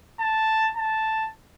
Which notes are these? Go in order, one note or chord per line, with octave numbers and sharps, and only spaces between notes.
A5
A5